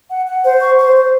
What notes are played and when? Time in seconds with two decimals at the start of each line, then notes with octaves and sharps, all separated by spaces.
0.09 F#5
0.26 F#5
0.44 C5
0.60 C#6
0.79 C5
0.95 C5